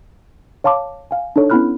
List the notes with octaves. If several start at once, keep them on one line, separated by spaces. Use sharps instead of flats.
C#5 F5 A5 C6 D6
F5 G#5
D4 D#4 A4 C#5
B3 C#4 E4 B5 F6 F#6